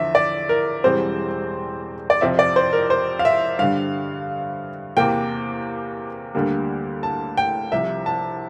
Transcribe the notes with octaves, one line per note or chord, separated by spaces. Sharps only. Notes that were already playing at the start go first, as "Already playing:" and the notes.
Already playing: E2 D3 F3 E5
D5
A#4
E1 E2 E3 G3 C4 C5
D5
F2 C3 F3 C4 E5
D5
C5
A#4
C5
F5
E5
G2 D3 G3 F5
E2 C3 E3 A#3 G5
D2 D3 G3 A#3
A5
G5
C2 C3 F3 E5
A5